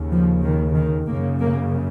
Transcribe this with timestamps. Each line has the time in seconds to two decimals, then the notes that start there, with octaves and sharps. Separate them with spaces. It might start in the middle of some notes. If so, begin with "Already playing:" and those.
Already playing: D#2 C#3
0.11 F3
0.43 D#3
0.76 D#3
1.08 F#2 C#3 A#3
1.40 A#3